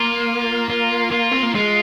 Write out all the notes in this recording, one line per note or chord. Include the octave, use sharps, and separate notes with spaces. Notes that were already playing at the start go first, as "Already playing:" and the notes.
Already playing: A#3 F4
F4
F4
C4
A#3
G#3 F4